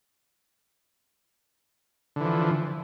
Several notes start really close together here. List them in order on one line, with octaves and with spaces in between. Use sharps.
D3 E3 F3